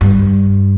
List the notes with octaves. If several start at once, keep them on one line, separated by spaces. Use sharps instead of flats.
G2